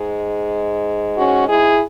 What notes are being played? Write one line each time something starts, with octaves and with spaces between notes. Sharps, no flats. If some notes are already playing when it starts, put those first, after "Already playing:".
Already playing: G#2 G#3
C#4 F#4
E4 G#4